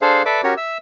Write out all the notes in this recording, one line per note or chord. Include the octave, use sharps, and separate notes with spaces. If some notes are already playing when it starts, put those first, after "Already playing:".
D4 G#4 A4 C5 F5
A4 B4 D5 E5 D6
C#4 F#4 G4 A#4 C#5
E5 E6